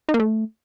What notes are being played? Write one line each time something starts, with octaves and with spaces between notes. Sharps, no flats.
D#4
A#3
A3